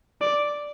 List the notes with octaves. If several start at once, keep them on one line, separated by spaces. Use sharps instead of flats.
D5